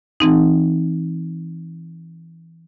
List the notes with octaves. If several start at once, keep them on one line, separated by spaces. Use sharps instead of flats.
E3 C4 D#4